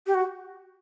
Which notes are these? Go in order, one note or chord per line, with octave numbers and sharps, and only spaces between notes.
G4
F#4